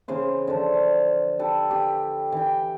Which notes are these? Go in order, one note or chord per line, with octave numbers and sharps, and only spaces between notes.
C#3 E3 C5 F5
D3 F3 C5
F5
G4 A4 B4
G4
E3 G5